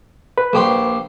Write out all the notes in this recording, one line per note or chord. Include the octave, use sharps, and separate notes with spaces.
B4
A#1 G4 C6